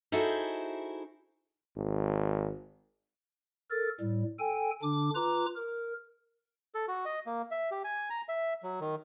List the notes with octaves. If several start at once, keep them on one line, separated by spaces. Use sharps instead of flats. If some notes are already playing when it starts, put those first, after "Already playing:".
D#4 E4 F#4 G#4 A4 C5
G#1
A4 A#4 A6
A2 G3
A4 G5 G#5
D3 D4 D6
F4 B4 A#5 D6
A#4
A4
F#4
D#5
A#3
E5
G4
G#5
A#5
E5
F#3
D#3